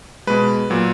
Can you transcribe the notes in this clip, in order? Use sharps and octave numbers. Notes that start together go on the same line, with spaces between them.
B2 G#3 B4
A#2 F#3